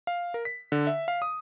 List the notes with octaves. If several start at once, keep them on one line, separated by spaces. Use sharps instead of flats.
F5
A#4
B6
D3
E5
F5
D#6